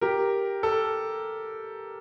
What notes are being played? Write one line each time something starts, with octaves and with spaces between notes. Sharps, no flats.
G4 A#4
A4